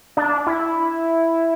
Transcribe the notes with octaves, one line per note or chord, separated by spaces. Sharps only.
D4
E4